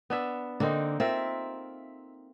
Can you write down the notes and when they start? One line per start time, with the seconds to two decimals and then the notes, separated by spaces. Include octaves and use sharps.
0.10 B3 D4 E5
0.60 D3 A#3 C4 D#4
1.00 C4 F4 A#4 E5